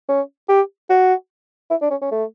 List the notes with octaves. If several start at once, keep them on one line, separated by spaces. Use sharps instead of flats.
C#4
G4
F#4
E4
D4
C#4
C#4
A3